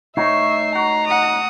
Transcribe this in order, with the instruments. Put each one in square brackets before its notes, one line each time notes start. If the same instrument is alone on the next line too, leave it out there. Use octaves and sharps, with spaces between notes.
[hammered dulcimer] A2 C#5 [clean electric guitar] D#4 [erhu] E5 [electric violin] C7
[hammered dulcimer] F#4 [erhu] A#5
[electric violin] F#5 D#6